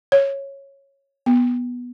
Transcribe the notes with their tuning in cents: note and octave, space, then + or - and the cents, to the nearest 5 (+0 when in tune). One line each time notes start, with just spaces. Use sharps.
C#5 -10
B3 -10